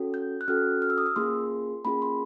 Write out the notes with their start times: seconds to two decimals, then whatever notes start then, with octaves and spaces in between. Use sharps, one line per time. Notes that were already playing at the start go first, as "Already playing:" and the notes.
Already playing: C#4 F#4 A4
0.14 G6
0.41 F#6
0.48 C#4 F#4 A4 F6
0.82 F6
0.90 E6
0.98 D#6
1.06 E6
1.16 A#3 C#4 F4 G#4 C6
1.85 A#3 C#4 F4 G#4 B5
2.02 C6